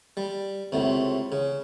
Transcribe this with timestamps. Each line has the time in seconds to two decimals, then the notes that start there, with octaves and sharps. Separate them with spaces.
0.17 G3
0.72 C#2 A2 C3
1.32 C#3